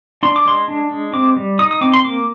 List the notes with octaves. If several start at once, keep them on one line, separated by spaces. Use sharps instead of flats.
D4 C6
D6
G#3 C6
D4
G#3
C4 D6
G3
D#4 D#6
D#6
C4 D6
C6
A#3 D6